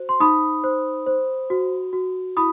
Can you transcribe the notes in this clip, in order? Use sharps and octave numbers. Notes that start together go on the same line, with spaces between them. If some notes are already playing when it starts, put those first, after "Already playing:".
Already playing: F#4 C5
C6
D#4 B5 D#6
C5
C5
F#4
F#4
E4 B5 D#6